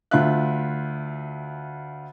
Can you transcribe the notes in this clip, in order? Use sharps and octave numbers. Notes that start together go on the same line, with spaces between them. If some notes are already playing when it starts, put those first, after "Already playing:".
D2 F4 E5 F#6